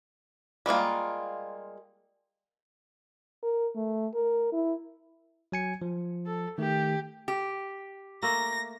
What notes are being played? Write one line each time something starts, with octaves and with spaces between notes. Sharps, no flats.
G3 G#3 A#3 F4
A#4
A3
A#4
E4
F#3 G#5 C#7
F3
A4
D#3 A3 G4
G4
A3 A#3 A#6